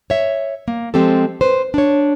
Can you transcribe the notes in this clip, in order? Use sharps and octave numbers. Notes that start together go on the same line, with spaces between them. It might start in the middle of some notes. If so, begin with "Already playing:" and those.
C#5 E5
A#3
F3 G#3 C4 G4 A4
B4 C5
D4 C#5